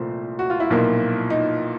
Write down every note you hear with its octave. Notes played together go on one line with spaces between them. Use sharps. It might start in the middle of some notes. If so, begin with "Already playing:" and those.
Already playing: C2 A#2 F3 A3 C5
F#4
F4
E4
B1 A#2 F3 A#3
D#4